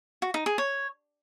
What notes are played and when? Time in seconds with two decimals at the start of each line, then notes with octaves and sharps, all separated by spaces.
0.22 F#4
0.34 D#4
0.46 G#4
0.58 C#5